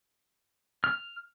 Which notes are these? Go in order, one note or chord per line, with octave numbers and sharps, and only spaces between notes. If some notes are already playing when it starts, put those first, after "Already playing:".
F6